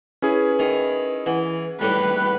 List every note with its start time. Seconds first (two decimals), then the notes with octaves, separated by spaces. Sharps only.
0.22 C#4 E4 G#4 B4
0.59 D#3
1.26 E3 F#5
1.81 A2 G3 B4